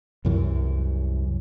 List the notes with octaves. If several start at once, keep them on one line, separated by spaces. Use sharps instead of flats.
C2 F#2 E3